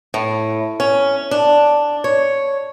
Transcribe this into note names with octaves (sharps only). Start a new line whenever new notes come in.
A2
C#4
D4
C#5